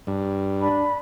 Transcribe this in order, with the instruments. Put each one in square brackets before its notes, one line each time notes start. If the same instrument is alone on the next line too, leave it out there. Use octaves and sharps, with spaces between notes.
[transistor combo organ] G2
[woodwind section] D4 [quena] B5